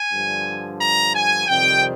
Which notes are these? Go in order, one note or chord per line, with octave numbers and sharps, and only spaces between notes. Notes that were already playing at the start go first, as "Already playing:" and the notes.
Already playing: G#5
G2 D3 F3
A#5
G#5
F2 C3 D#3 G3 C4 G5